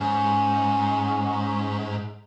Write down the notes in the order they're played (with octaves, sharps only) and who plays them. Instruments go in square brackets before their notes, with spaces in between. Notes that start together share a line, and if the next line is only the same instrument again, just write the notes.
[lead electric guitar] G#2 [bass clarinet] C#4